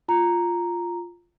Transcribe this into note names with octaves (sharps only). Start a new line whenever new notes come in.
F4 A#5